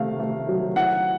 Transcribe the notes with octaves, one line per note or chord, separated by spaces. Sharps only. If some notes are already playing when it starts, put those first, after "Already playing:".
Already playing: C3 D#3 A3 F5
A3
F#3
E4 F#5